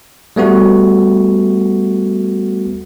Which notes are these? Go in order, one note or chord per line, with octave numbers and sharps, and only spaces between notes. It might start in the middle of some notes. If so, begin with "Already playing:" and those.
G3 A3 B3 F#4